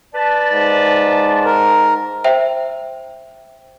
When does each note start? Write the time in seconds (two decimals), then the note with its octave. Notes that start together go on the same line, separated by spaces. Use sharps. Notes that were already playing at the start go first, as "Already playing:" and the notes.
0.15 B4 D5 A5
0.53 G#2
1.45 A#4
2.24 C5 E5 G5